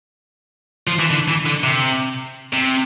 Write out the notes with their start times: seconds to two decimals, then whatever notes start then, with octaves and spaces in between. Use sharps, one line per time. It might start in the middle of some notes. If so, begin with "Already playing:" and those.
0.87 F3
0.99 E3
1.11 D3
1.28 E3
1.46 D3
1.64 C3
2.53 C3